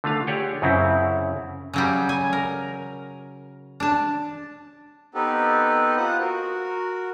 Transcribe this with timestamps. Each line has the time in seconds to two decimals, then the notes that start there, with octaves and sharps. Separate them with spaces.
0.04 D3 A3 F4 F5
0.27 G4 G#4 C#5 D5 F#5 G5
0.62 F#2 C#3 C4 C#4 E4
1.73 C#3 F#3 G3
2.09 G#5
2.33 A#4
3.80 D4 A5
5.14 B3 C4 D#4 G4 A4 B4
5.97 F4 C5 F#5 D#6 F#6
6.20 F#4 A#4